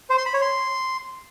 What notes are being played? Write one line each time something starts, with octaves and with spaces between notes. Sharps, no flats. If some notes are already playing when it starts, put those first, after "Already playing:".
C5
C6
B5
C#5
C6